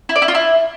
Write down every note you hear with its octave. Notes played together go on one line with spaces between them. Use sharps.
E4
D5
E4
F4
E4